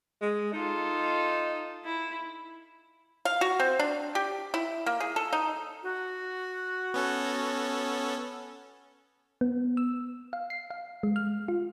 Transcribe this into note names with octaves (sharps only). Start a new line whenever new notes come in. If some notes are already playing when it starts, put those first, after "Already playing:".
G#3
D#4 F4 A4
E4
F5
F#4
C4
D4
G4
E4
A#3
G#4
A4
D#4
F#4
B3 C#4 A4
B3
E6
F5
C7
F5
G#3
F6
F4